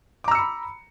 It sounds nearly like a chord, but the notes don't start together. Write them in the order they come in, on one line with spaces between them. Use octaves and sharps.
D6 A#5 E6 C#7 B5